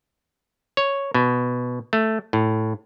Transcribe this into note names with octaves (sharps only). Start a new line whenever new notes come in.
C#5
B2
A3
A2